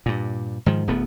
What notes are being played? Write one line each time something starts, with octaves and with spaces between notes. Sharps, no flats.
G2 A#2
G#2 D#3 F3
D1 D2 A3 B3